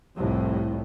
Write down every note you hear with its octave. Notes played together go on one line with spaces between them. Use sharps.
C2 F2 A2